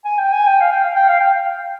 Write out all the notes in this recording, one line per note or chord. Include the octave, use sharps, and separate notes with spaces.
G#5
G5
G#5
G5
F5
G5
F5
G5
F5
G5